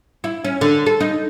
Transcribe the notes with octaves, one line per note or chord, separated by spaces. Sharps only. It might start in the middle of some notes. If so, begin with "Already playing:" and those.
E4
C#4
D3
A4
D#4